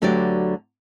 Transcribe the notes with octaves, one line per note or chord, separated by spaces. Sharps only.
D2 D3 F#3 B3 G4 D5